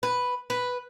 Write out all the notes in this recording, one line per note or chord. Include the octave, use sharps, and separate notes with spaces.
B4
B4